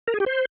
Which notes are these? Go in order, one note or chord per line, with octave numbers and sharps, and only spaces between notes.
A#4
G#4
G4
C5